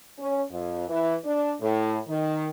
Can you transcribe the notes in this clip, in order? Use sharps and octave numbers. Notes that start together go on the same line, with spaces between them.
C#4
F2
E3
D4
A2
D#3